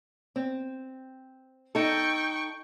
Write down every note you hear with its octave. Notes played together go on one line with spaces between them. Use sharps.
C4
D#4 A4 G5 C#6